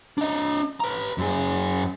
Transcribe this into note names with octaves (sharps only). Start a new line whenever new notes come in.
D4 D#5
B4 A#5
F#2 G#4